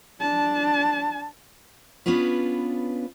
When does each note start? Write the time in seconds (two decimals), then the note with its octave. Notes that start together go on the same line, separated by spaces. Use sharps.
0.21 D4 A5
2.06 B3 C#4 D4 F4 B4